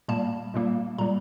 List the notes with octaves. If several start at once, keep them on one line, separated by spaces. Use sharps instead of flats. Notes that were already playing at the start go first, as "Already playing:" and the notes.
A#2 G3 A#3 A5
A#2 G3 A#3
A#2 G3 A#3 A#5